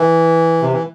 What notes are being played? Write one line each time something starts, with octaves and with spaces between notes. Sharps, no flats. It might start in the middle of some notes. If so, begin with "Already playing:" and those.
Already playing: E3
C3
E3